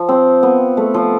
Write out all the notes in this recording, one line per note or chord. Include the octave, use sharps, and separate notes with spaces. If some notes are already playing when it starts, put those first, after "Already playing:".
Already playing: F3
C4
B3
A3
F3